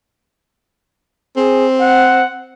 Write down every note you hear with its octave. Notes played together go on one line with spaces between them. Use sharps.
C4 G#4
F#5